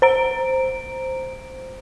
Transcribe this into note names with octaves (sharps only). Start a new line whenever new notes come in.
C5 A#5 D7